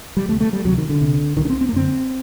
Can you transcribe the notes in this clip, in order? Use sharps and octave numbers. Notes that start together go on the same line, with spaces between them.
G3
D2 C3 A3
A3
G3
D2 C3 F#3
D#3
D3
C2 C3
C2 C3 D#3
D4
C4
C4
A#3
F#2 D3 C4